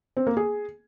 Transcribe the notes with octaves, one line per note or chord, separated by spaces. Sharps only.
C4
A#3
G#4